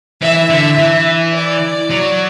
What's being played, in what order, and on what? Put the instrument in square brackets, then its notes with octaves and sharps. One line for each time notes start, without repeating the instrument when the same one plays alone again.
[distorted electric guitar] E3 [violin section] E5
[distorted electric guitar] D3
E3
[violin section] D5
[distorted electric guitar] F#3